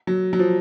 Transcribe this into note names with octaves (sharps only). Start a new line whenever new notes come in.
F#3
F#3
F3